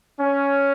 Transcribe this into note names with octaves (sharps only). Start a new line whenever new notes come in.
C#4